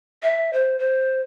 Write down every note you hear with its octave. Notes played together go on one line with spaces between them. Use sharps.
E5
C5
C5